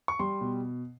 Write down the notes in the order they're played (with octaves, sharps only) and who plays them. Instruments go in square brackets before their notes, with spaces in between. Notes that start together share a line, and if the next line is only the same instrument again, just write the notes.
[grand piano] C#6
G3 C6
B2